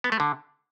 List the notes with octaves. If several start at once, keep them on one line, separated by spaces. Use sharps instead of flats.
B3
A3
D3